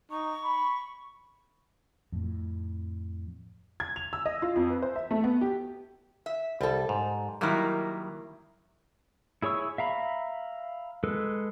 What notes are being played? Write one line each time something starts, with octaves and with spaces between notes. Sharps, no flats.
D#4 C#6
B5
F2 A2
G#6
F7
E6
D#5
F4
F2
B4
C5
E5
A3
B3
G4
E5
C2 G3 A4
G#2
D#3 F#3 G3 A#3 D#4 E4
E4 G#4 C#5 C#6 E6
E5 F5 A#5 B5
G#3 A4 B4